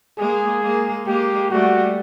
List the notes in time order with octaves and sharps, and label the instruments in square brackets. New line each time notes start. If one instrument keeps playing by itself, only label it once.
[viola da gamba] G#3 A#3 [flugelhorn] G#4
[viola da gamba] G#3 A#3
[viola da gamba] G#3 A#3 [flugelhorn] G4
[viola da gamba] G3 A3 [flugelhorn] F#4